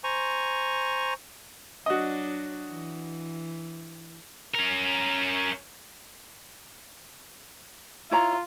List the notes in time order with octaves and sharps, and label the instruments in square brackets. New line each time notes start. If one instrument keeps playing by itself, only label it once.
[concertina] C5 G#5 A#5 C#6
[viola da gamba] F#3 D4 [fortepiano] F#4 D#5
[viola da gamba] E3
[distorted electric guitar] C#4 A#4
[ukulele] E4 C#5 A#5 [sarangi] F4